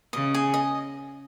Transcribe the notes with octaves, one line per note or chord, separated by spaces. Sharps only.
C#3 D#5
G#4
D#5